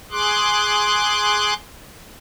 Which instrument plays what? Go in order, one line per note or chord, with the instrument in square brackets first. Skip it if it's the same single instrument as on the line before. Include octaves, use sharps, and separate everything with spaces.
[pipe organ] G#4 C6 D6 F#6